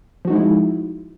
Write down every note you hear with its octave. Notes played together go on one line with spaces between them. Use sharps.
F3 G#3 D#4 E4 F#4